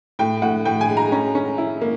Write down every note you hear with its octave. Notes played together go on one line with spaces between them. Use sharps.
A2 G5
A2 F#5
A2 G5
G#5
G#3
A#5
C#4
C#4
E4
A#3